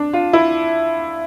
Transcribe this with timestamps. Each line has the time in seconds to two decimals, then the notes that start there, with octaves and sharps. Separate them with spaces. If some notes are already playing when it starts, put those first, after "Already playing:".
Already playing: D4
0.13 F4
0.33 E4